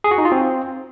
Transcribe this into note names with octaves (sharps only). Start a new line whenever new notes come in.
G#4
F#4
D#4
F4
C4